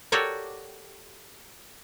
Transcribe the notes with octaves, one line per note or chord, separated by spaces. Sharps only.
F#4 G4 A4 A#4 C#5 D5